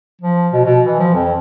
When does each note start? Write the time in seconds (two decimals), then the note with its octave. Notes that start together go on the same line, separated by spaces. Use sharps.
0.21 F3
0.53 B2
0.65 B2
0.85 E3
1.00 F3
1.15 F2